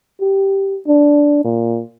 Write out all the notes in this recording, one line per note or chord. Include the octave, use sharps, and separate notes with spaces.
G4
D4
A#2